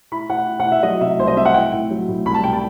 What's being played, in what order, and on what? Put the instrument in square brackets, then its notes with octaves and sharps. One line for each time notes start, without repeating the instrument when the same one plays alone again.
[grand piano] E4 B5
E4 F#5
E4
F#5
E4
E5
F#3 D#5
C3 E5
C2 C5
D#5
C4 E5
F#5
E4 G5
A2
F#3
A2
C2 B5
A5
C2 G5
A5